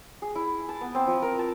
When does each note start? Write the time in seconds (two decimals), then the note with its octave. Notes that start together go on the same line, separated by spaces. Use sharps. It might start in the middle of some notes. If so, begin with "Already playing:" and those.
0.22 G#4
0.35 E4
0.69 A5
0.81 B3
0.95 C4
1.07 F3
1.22 A#4
1.39 A5